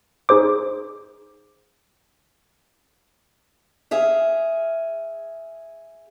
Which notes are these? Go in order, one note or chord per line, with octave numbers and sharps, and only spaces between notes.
D#4 G#4 C5 D6
G#4 E5 F5